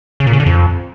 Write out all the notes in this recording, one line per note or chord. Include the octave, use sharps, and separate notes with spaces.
C#3
A#2
C#3
D3
F2